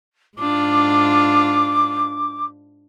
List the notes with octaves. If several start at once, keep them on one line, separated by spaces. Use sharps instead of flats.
G#2 D4 F4 D6